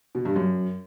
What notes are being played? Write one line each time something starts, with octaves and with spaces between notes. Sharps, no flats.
B2
G2
F#2